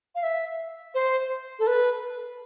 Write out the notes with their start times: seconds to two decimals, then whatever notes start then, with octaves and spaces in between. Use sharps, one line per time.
0.15 F5
0.23 E5
0.94 C5
1.59 A4
1.67 B4